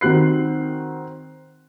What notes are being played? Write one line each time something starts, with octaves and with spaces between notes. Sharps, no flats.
D#3 C4 F#4 F#6 C7